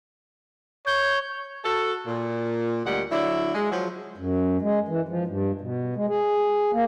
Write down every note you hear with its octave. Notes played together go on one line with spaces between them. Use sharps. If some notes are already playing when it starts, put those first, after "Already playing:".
C#5 G6
F#4 A4
A#2
D2 A#2 G3 G#3 F#5
D3 F#3 D4 E4
G#3
F3 F#3
F#2
G#3
E3
F3
G2
B2
G#3
G#4
A#3